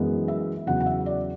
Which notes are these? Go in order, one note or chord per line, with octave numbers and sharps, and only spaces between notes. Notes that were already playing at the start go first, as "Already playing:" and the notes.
Already playing: F#2 E3 G#3 B3
E5
E2 C#3 F#3 F#5
F#5
E5
D5